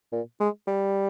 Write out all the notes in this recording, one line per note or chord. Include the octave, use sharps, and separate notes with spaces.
A#2
G#3
G3